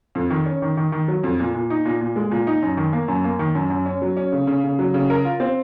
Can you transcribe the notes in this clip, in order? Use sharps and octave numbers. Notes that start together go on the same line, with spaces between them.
F2
D#3
C#4
D#3
D#3
D#3
F#3
F2
A#2
A#2
D#4
A#2
A#2
G#3
A#2
D#4
F#2
D#3
A#3
F#2
A#3
D#3
F#2
F#2
C#4
F#3
C#4
C#3
C#3
C#3
F#3
C#3
A#4
F4
C4